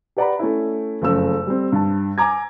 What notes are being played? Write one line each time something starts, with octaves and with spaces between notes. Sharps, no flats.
G4 B4 D5 F#5 A#5 B5
A3 C#4 E4
F#1 F2 C#3 A3 E6
G3 C4
G2 A5
G#5 A#5 D6 G#6